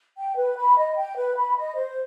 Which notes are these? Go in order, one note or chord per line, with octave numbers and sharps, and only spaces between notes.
G5
B4
B5
D#5
G5
B4
B5
D#5
C5